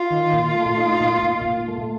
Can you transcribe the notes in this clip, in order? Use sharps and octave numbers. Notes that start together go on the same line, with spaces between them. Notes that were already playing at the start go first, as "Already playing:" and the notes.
Already playing: F4
D#3
A#2
A3
D#4
A#2
A#2
A#2
A3